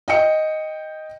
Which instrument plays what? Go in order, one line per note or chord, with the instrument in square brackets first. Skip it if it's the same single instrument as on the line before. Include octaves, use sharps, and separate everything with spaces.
[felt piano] D#5 G5 C#7